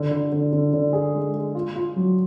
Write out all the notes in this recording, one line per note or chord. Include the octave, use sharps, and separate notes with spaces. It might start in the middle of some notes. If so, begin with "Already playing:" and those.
Already playing: D3
D3
D3
D3
D3
G#4
G#3
G#3
F4
F4
F#3